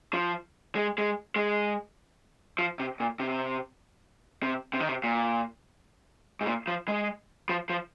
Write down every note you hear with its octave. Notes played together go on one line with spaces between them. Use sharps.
F3
G#3
G#3
G#3
F3
C3
A#2
C3
C3
C3
D#3
C3
A#2
G#2
A#2
F3
G#3
F3
F3